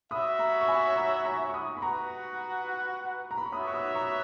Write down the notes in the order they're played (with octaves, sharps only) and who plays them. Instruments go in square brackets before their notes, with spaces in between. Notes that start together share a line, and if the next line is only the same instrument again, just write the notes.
[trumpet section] F#4 C#5 E5 [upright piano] B5 D#6
[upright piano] A#5 C#6
C#6
G#5 B5
A#5 C#6
A#5 C#6
C#6
B5 D#6
B5
[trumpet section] F#4 B4 F#5 [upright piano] A#5 C#6
[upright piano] A#5
B5
C#6
[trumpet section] B3 F#4 C#5 E5 [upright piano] B5 D#6
[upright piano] C#6
B5 D#6
A#5 C#6